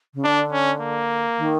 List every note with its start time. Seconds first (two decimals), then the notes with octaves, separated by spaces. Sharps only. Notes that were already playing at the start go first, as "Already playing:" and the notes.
0.14 C#3
0.24 D3 D4
0.53 C#4
0.80 A#3
1.38 D#3